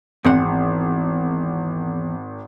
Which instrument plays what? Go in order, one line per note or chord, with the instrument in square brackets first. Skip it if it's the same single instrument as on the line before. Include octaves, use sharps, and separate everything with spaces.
[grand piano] G#1 [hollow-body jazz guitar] E2 C4 F#5